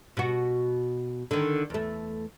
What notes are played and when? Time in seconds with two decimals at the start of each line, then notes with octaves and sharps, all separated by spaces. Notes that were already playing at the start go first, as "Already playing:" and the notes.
0.17 B2 F#4
1.31 D3 D#3
1.70 E2 A3